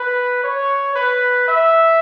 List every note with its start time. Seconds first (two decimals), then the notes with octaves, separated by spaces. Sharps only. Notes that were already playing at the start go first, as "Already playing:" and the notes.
Already playing: B4
0.44 C#5
0.96 B4
1.48 E5